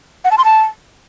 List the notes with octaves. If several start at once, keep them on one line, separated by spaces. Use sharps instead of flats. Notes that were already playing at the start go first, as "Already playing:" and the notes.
F#5
A5
C6
A5